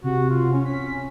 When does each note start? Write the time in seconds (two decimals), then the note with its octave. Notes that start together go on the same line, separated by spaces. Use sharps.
0.04 C3 F#4
0.30 F4
0.52 C#4
0.65 C#4 B6